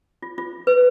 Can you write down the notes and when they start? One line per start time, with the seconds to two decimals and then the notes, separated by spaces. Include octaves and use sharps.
0.22 F4
0.38 F4
0.67 B4